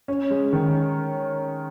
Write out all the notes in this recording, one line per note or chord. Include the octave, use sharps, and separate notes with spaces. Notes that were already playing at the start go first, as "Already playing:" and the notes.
C#4
G#3
D#3